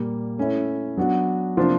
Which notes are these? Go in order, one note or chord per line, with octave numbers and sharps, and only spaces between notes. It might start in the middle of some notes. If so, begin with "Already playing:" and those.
Already playing: A#2 G3 A#3
A3 C#4 E4
F#3 B3 D4 F#4
C3 F3 A#3 D4 F4